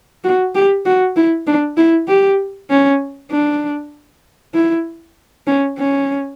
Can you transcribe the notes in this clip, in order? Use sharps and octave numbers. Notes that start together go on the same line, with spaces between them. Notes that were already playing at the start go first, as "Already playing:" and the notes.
F#4
G4
F#4
E4
D4
E4
G4
C#4
D4
E4
C#4
C#4